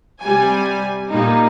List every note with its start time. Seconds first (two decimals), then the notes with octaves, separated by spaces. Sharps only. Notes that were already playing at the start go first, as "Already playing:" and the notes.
0.22 C3 G3 G#5
1.10 A#2 G3 A#3 D#4